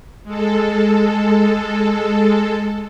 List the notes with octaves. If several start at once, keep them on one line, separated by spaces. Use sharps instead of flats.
G#3 A4